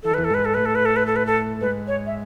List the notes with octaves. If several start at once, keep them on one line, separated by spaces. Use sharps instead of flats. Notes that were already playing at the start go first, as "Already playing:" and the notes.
E3 A4
D#3
E2 E3 B4
A4
G#2 G#3 B4
A4
A2 A3 B4
A4
B4
A4
B4
A4
B4
A4
G#2 G#3 B4
C#5
E5